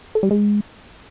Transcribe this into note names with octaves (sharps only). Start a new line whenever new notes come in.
A4
G3
G#3